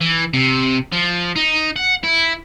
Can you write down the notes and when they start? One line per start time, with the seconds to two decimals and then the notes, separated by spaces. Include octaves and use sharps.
0.01 E3
0.34 C3
0.92 F3
1.36 D#4
1.76 F#5
2.04 E4